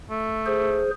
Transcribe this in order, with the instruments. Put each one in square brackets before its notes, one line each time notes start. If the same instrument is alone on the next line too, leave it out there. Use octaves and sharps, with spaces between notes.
[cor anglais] A3
[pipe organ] G#4 C5